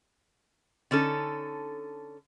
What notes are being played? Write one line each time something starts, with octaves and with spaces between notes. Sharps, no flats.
D3 C#4 D#4 A4